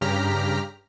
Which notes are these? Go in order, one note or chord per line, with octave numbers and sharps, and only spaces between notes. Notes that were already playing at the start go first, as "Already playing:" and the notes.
G2 C#3 G4 A#5 F6 B6